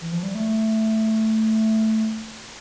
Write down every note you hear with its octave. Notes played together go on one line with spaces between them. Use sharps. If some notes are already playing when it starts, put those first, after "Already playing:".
E3
F3
G3
A3